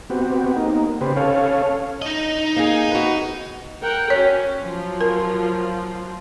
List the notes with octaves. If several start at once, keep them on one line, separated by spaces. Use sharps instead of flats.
B3 C4 F#4 G4
A#3 D#4
C#3 G4 B4 C5
C#4 A4 C#5 F5
D#4 D#5
A#3 G#4
F#4 B4
A#4 F#5 G5
C#4 F#4 C#5
F3 F#3 F4
A#4